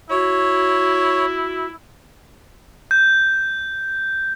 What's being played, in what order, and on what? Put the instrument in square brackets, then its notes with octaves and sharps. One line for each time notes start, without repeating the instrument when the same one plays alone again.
[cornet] E4 [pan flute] F#4 [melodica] C#5
[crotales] G6